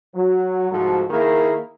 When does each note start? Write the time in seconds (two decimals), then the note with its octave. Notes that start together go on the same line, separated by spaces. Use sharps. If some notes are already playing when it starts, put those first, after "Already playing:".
0.15 F#3
0.71 C2 G#2 F3 F#4 A4
1.10 D#3 A#3 E4 G#4 A#4